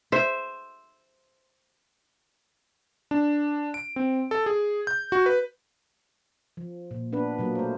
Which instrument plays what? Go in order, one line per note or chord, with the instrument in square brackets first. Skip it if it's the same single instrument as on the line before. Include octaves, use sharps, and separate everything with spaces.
[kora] C5 E5
[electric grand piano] D4
D7
C4
A4
G#4
G6
F#4
B4
[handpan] F3
A#2
B3 D4 B4
B2 F#3 A#3
A3 C5